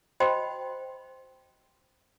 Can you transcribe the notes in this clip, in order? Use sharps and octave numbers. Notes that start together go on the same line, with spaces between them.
F#4 C5 D#5 G5 B5 C6